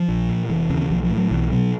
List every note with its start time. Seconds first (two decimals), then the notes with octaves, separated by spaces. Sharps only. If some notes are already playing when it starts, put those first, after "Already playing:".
Already playing: F3
0.08 A#1
0.29 A#2
0.49 F1 E3
0.70 D#2 C#3
0.90 B1 F3
1.03 F3
1.10 A2
1.17 F#3
1.31 B1 E3
1.51 B2 F#3